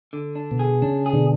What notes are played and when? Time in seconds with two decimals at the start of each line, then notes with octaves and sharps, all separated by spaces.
0.13 D3
0.35 D4
0.51 B2
0.59 G#4
0.82 C#3 D4
1.06 G#4
1.13 B2 D3